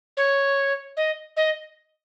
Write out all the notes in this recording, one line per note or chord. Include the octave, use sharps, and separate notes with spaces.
C#5
D#5
D#5